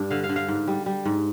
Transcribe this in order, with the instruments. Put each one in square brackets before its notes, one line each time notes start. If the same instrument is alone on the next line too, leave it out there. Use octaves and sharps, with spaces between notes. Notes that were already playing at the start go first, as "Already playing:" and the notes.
Already playing: [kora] G2 D4
D3 F5
F5
D3
F5
G#2
G3
G3
G#2